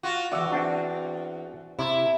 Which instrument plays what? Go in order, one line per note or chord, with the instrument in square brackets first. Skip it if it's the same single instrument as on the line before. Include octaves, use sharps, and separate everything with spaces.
[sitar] F4 F#4
[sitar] E2 A#2 [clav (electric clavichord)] F#4 D5 E5
[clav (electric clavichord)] C4 D4 F#4
[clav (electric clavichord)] C3 [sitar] E4